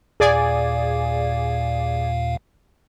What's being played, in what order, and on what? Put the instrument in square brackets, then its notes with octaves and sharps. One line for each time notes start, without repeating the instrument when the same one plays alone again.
[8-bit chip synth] D#2 A#2 F5 [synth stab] G#4 D5 G#5